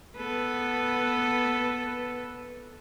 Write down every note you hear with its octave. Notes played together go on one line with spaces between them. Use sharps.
B3 A4 B4